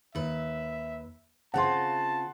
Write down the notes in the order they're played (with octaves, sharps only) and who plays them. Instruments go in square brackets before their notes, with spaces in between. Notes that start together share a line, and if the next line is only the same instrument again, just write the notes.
[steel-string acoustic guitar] D#2 B4 [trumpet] E5
[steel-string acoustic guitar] C#3 C4 F4 [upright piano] F#5 C6 [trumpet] A5